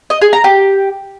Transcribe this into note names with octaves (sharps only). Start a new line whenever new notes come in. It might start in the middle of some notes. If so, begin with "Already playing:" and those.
D#5
G#4
A#5
G4